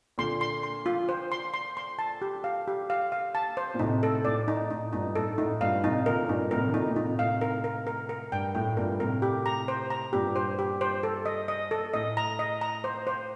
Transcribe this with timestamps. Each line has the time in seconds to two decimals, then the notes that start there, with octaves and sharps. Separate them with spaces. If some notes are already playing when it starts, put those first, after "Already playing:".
0.18 A#2 D3 C6
0.41 C6
0.63 C6
0.86 F4
1.09 C5
1.32 C6
1.54 C6
1.77 C6
1.99 A5
2.22 G4
2.44 F5
2.68 G4
2.90 F5
3.12 F5
3.35 A5
3.57 C5
3.74 A#2
3.79 A2 C3 D#4
4.03 A4
4.25 A2 D5
4.48 D#4
4.70 A2 D#4
4.93 G2 A#2 D#4
5.15 A2 A4
5.38 A2 D#4
5.61 G2 A#2 F5
5.83 A2 C3 D#4
6.05 A#2 D3 A#4
6.28 G2 A#2 D#4
6.51 A2 C3 A#4
6.68 D#3
6.73 A#2 D3 D#4
6.90 A#2
6.96 A2 C3 D#4
7.19 A2 C3 F5
7.41 A#4
7.64 A#4
7.87 A#4
8.09 A#4
8.32 G2 G5
8.55 A2 G5
8.77 G2 A#2 A#4
8.99 A2 C3 A#4
9.22 G4
9.46 A#5
9.68 C5
9.90 A#5
10.13 G2 A#2 G4
10.36 C5
10.59 G4
10.81 C5
11.03 A4
11.26 D#5
11.48 D#5
11.71 A4
11.94 A2 D#5
12.17 A#5
12.39 D#5
12.61 A#5
12.84 C5
13.07 C5